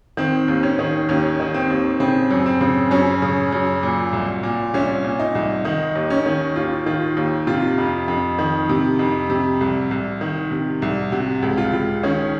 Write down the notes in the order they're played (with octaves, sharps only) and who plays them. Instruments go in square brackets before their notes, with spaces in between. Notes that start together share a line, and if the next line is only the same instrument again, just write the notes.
[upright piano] D#3 C4
D#2
C#4
D#3
D#2 C#4
D#3
C4
D#2
C#3 C4
F#2
C4
C#3
F#2 C#4
C#3
F#2
A#2
C2
A#2
C2 C#4
A#2
D#4
C2
D#3 D#4
D#2
C#4
D#3
D#2 F4
D#3 F4
D#2
C3 F4
F2
F2
D#3
C3
F2
C3
C2
C2
D#3
C3
C2
C3 F#4
C#2
F4
C#2
D#3 C#4